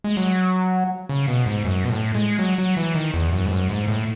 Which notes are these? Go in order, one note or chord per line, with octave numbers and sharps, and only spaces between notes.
G#3
F#3
C#3
B2
G#2
F#2
B2
A2
G#3
F#3
F#3
E3
D#3
E2
F#2
G#2
F#2
G#2
A2